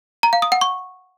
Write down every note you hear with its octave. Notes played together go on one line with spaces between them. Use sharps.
A#5
F5
D#6
F#5
C#6